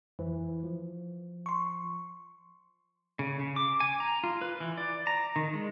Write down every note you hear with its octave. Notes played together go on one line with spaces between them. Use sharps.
F2 E3
F3
C6 C#6
C#3
C#3
D6
G#5
A#5
F4
B4
E3
D5
A#5
D#3
G#3